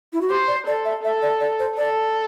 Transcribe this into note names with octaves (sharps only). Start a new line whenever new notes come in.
E4
F#4
G4 C5
D5
A4 D5
E5
A4 E5
D5
D5
C5
A4 D5